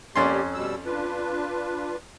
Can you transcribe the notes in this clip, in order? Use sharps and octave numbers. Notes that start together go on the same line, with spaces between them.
F2 A#3 C#4 G4 D5 C6
B2 G3 E6
D4 F4 B4